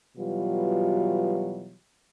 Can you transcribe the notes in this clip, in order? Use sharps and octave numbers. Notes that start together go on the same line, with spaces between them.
B2 E3 F#3 G3 F4